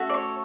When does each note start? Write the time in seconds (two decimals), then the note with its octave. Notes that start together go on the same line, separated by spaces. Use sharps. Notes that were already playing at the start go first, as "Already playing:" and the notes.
Already playing: A3 C#4 F#4 A4
0.10 D5
0.14 C#5